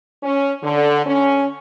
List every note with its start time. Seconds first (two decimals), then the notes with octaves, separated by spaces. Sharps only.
0.23 C#4
0.62 D3
1.06 C#4